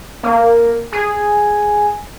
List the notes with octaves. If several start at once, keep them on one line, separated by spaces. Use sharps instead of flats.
A#3
G#4